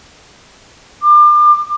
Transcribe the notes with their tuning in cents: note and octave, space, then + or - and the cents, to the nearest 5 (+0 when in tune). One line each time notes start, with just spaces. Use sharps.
D6 +35